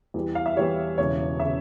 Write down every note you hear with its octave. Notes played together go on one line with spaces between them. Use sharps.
E2 E3 G3
F5
E5
E2 E3 G3 C#5
E1 E2 C#3 C#5
C#3 E5